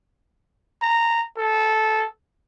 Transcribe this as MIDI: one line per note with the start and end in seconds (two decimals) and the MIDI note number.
0.82 1.22 82
1.38 2.06 69